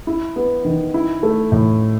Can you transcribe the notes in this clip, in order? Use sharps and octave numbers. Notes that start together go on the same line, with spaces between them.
E4
B3
D#3
E4
A3
A2